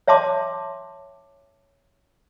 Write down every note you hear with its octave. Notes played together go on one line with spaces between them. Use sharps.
C#5 E5 G5 A5 C6 D6